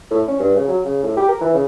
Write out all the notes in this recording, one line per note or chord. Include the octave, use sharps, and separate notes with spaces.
A2
C#4
G2
C#3
F#3
C#3
A2
G4
A#4
E3
C#3